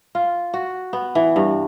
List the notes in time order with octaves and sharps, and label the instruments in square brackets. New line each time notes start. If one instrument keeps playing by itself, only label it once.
[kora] F4
F#4
B3
E3
G2